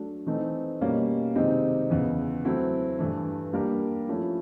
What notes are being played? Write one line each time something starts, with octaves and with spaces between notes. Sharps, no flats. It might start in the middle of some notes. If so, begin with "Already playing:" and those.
Already playing: F#3 A3 D4
E3 A3 C4 D#4
B2 G3 A#3 C#4
C3 D#3 G#3 C4 D#4
E2 C#3 E3
F#3 A3 C4 E4
G2 E3 A3
G3 A#3 D4 G4 A#4
F3 A3 C#4 E4